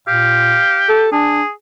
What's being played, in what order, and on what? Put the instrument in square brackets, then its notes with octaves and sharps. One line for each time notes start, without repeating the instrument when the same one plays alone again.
[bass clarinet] A#2 [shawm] G4 [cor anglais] F5
[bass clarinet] A4
[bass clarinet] D4 [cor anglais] G#4